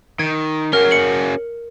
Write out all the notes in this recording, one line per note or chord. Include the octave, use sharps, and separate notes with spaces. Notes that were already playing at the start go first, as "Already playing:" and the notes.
D#3 G#6
C#4 F#4 G#4 A#4 F6
C#7 F#7